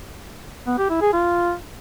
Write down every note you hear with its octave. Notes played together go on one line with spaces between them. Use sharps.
B3
G4
E4
G#4
F4